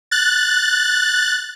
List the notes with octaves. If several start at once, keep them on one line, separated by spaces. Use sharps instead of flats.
F#6 A6